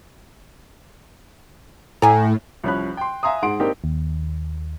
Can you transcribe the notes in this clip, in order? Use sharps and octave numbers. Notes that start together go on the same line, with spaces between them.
A2 G#5 A#5
C2 F3 C#4 B5 F#6
G5 C6
E5 F5 G#5 A#5 C6 D#6
G#2 G#4 F#5 C6 D7
A#3 C4 D4 D#4 G4 A#4
D#2